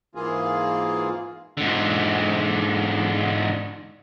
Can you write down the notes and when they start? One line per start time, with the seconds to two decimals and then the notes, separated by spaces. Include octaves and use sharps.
0.15 G#2 E3 A#3 F4 G#4
1.57 G#2 D3